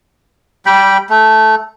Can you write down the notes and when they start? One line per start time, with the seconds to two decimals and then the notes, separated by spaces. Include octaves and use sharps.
0.66 G3 G5 B5
1.10 A3